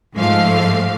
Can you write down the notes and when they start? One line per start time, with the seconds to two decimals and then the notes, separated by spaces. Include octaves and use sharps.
0.15 G#2 F3 A3 F5